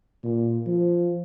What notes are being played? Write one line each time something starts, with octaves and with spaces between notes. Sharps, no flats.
A#2
F3